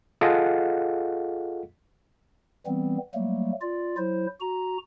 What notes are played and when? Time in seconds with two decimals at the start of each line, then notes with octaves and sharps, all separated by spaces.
0.21 F4 G#4 A4 D#5 F5 F#5
2.66 E3 G3 B3 C4
3.14 F#3 G3 A3 A#3
3.61 F4 D5
3.97 F#3 E4 C5
4.41 F#4 A#5